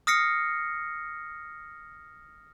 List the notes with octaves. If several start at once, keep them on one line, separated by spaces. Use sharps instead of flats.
D#6 F6 A#6 C7 C#7